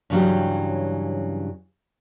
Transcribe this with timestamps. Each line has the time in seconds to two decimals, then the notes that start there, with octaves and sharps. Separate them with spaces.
0.10 G2 C#3 E3 F#3 C#4 G4